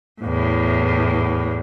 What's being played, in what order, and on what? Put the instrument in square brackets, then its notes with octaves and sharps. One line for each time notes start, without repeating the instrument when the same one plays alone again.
[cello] E2 A2